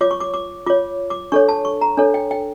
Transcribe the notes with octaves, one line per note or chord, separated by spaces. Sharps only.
F4 C#5 D6
C#6
D6
D6
F4 C#5 D6
D6
D4 A4 C#5 C#6
A5
C#6
A#5
D4 A4 C#5
G5
G5